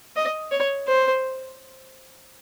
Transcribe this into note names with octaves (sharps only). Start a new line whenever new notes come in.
D#5
C#5
C5